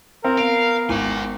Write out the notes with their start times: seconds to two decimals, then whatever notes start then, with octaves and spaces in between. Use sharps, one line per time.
0.25 C4 A#4
0.38 B3 F5 D7
0.89 G#1 C5 G#5